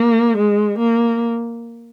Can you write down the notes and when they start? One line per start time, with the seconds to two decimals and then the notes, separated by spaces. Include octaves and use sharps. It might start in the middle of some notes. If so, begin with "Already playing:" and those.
Already playing: A#3
0.37 G#3
0.79 A#3